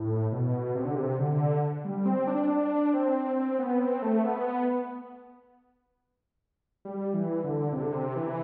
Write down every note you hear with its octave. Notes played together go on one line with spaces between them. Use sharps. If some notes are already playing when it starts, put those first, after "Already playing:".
Already playing: A2
B2
C3
D3
C3
D3
G3
C4
D4
D4
C4
C4
B3
C4
A3
B3
G3
E3
D3
C3
D3
C3
E3